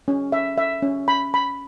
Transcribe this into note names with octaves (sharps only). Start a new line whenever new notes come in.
C#4
E5
E5
C#4
B5
B5